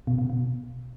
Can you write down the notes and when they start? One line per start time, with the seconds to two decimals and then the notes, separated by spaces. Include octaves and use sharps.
0.07 B2
0.18 B2
0.30 B2